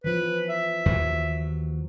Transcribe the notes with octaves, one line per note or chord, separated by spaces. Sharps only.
E3 F3 B4
E5
D#2 F#3